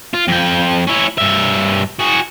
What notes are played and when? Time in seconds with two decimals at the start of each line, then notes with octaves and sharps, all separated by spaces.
0.14 F4
0.28 F2 G5
0.87 C#4 E4
1.18 G2 E5
2.00 F#4 G#4